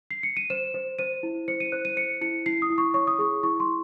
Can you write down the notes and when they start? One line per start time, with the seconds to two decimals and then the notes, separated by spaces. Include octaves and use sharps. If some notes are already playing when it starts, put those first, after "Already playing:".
0.11 C7
0.23 C#7
0.37 D#7
0.50 C5 E7
0.74 C5
0.99 C5 D#7
1.23 E4
1.48 C5 C#7
1.60 D#7
1.72 C5 F#6
1.85 D#7
1.97 C5 C#7
2.21 E4 C#7
2.46 E4 C7
2.62 D#6
2.70 E4
2.78 C#6
2.94 C#5 C#6
3.07 D#6
3.19 G#4 C#6
3.43 E4 C#6
3.60 C6
3.68 E4